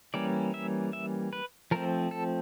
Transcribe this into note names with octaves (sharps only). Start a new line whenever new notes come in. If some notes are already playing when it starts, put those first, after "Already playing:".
E3 G3 A#3 C#4 D5
E5
E5
B4
F3 A3 C4 A#4
A4